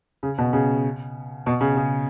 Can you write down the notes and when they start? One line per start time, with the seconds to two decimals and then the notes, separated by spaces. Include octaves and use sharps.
0.23 C#3
0.38 B2
0.53 C#3
1.46 B2
1.61 C#3
1.77 C#3